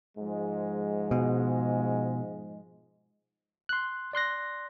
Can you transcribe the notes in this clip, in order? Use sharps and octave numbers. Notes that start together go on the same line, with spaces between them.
G#2 F3 G#3
B2
C6 F#6
D5 C6 F#6 A#6